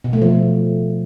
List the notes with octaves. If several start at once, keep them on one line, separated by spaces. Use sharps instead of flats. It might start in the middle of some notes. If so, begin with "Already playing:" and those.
B2
A3
F3